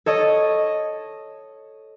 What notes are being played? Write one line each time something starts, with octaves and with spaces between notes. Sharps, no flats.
A4 C#5 D#5